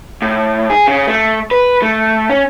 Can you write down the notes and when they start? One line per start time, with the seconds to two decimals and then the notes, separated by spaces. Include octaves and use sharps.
0.22 A2
0.70 G#4
0.87 C#3
1.07 A3
1.51 B4
1.82 A3
2.30 C#4